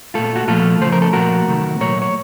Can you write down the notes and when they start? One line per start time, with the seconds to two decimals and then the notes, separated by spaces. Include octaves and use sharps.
0.14 A#2 A3 F4 A4
0.36 F#4
0.48 A#2 F3 A3 F4 A4
0.81 C#3 F3 A3 C5
0.92 A#4
1.02 A4
1.13 A#2 F3 A3 F#4 A#4
1.48 C3 D#3 F#3 A3
1.80 A#2 F#3 A3 A#4 C#5
2.02 C#5